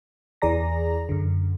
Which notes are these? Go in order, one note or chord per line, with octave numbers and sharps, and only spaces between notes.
E2 E3 G#4 D5 A#5 A#6
F#2 D3